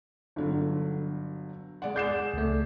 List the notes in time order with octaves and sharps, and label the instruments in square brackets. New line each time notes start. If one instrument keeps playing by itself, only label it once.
[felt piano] G1 D3 F#3
G#3 D5 F#5
[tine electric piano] G#4 D5 [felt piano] G6 C7 E7
[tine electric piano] C#2 A3